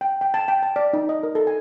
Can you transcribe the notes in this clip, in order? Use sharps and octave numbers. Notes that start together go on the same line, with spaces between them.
G5
G5
A5
G5
A5
D5
D#4
D#5
A#4
A4
G#5